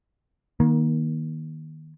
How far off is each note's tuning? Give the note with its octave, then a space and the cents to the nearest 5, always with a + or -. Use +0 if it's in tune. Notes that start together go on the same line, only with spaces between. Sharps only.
D#3 +0 A#3 +25